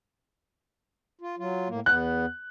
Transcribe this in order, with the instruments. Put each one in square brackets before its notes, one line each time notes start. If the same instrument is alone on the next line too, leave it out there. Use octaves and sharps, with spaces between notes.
[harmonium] F4
F#3 F4
A2 A#3
[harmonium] E2 B3 [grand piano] F#6